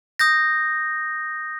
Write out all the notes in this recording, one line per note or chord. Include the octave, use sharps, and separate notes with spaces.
D#6 G6 A#6